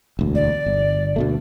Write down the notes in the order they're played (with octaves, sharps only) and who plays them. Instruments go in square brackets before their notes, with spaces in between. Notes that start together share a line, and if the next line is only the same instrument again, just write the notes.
[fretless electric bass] E1 D2
[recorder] D5
[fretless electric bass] G1
D2 B2 A3